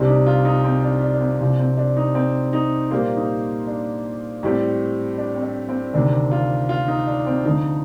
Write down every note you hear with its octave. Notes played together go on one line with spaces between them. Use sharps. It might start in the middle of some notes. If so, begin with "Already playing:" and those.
Already playing: C2 C3 G3 C4 D4
D#4
F4
D#4
C4
D4
D4
D4
C4
C2 C3 F3 C4 D4
C4
D4
D#4
C4
D#4
A#2 G3 A#3 C5
D#4
D4
A2 G3 C4
D4
C4
D4
C4
D2 C3 D#3 D4
F4
F4
D#4
D4
C4
D2 D3 F3 D#4